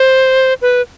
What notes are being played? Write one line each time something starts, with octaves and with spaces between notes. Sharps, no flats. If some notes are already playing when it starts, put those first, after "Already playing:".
Already playing: C5
B4